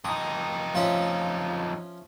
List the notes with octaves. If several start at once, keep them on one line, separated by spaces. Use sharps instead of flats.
F2 D#4 D#6
F3 C#4 E5